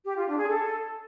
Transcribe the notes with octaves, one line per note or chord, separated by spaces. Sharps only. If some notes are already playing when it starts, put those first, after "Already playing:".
G4
F4
D4
G#4
A4